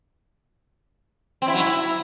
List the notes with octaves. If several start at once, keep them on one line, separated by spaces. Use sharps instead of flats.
C4
E4
F#3
E4